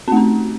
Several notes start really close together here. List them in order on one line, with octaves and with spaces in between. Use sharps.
C4 A3 C#4